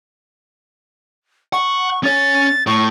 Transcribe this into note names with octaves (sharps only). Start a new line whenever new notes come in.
F#5 C#6
C#4 C#5 A6
A2 C#6